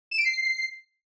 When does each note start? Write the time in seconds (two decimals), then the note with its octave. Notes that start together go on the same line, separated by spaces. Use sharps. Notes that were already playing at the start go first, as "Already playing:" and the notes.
0.11 E7
0.18 D7
0.24 C7